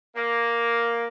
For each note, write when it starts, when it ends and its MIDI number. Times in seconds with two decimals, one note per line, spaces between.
0.15 1.06 58